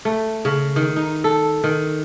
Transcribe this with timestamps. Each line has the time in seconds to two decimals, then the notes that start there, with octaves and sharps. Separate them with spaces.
0.05 A3
0.45 C#3
0.76 D#3
0.96 D#4
1.24 A4
1.64 D#3